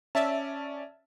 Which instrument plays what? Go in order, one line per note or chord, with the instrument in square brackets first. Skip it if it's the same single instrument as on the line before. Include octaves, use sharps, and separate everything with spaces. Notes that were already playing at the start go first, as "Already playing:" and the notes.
[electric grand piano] C#4 D5 [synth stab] E5 A5